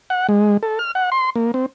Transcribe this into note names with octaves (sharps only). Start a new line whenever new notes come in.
F#5
G#3
A4
F6
F#5
C6
A#3
C4